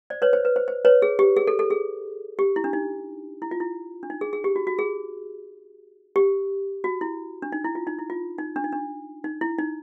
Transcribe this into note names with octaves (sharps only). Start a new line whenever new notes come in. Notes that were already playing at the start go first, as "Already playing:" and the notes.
C5 D5
B4 C#5
C5
B4
C5
C5
B4 C#5
G#4
G4
G#4
A4
A4
G#4
G4
E4
D4
D#4
E4
F4
E4
D4
D#4
G#4
G#4
G4
F#4
F#4
G#4
G4
F#4
E4
D4
D#4
E4
F4
D#4
E4
F4
D#4
D4
D#4
D4
D#4
E4
D#4